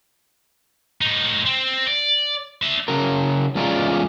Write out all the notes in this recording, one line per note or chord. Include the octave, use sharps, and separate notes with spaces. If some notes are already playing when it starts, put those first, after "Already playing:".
A2 D#4
C4
D5
D4 E5
C#3 F#3 A#4
E2 G#3 C#4 F4 D5 A#5